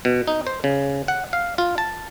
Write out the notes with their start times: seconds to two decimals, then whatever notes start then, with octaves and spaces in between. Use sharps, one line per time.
0.05 B2
0.27 D#4
0.47 C5
0.64 C#3
1.08 F#5
1.33 F5
1.58 F4
1.78 A5